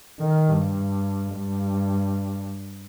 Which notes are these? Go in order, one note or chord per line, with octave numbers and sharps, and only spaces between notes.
D#3
G2
G2